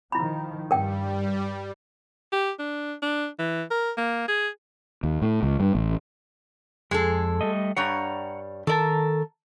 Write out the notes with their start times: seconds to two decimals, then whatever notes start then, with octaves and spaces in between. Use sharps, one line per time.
0.12 D#3 F3 E4 B5
0.71 G2 G3 A#4 G5
2.33 G4
2.59 D4
3.02 D4
3.39 E3
3.71 A#4
3.98 A#3
4.28 G#4
5.03 D#2
5.22 A2
5.43 C#2
5.60 G2
5.75 A1
6.91 F2 G#3 G#4 A4
7.41 G3 A3 D#5
7.77 G2 G3 C#5 F#5 A#5
8.67 D#3 A4 A#4 D5 A5